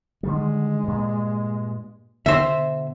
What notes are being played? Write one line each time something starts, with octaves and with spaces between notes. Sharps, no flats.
D3 D#3 G3 G#3
G2 A#2
B2 D3 C5 E5